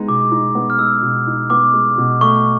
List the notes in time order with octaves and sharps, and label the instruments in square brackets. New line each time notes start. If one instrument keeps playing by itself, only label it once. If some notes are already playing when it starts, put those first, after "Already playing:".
Already playing: [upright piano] G#3 B3 D#4
[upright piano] B2 [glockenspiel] D6
[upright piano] D#4
B3
[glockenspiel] F6
[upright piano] G#3 [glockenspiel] E6
[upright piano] B2
D#4
[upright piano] B3 [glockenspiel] D6
[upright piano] G#3
B2
[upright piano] A3 [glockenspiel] C#6